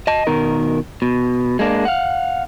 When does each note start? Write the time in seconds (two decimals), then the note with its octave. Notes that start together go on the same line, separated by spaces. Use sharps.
0.07 D#5 A5
0.27 B2 D#3 A#4
1.02 B2
1.59 G#3 A#3 D4
1.85 F5 F#5